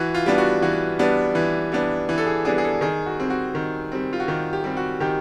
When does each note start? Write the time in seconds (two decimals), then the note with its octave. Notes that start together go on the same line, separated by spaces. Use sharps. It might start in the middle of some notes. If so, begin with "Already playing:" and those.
Already playing: E3 F#4
0.14 F4
0.26 G3 B3 D4
0.38 F#4
0.62 E3 F#4
0.99 G3 B3 D4
1.35 E3
1.72 G3 B3 D4
2.09 E3
2.18 A4
2.27 G#4
2.45 G3 B3 D4 G#4
2.58 G#4
2.64 A4
2.81 D#3 G#4
3.06 F#4
3.18 G3 C4
3.30 F#4
3.55 D#3
3.92 G3 C4
4.13 F4
4.20 F#4
4.28 D#3 G4
4.53 G4
4.64 G3 C4
4.77 F#4
5.00 D#3 G4